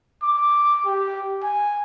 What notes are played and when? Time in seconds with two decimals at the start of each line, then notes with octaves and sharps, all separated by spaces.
0.23 D6
0.85 G4
1.43 G#5